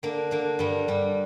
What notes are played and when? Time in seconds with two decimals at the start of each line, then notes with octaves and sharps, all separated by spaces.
0.03 D3 A#3 D4
0.31 D3 A#3 D4
0.59 G2 G3 A#3
0.88 G2 G3